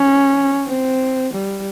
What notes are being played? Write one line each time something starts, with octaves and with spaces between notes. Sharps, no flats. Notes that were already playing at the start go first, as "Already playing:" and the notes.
Already playing: C#4
C4
G3